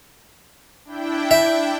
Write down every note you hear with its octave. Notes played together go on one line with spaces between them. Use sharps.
D4 E4 G5
E5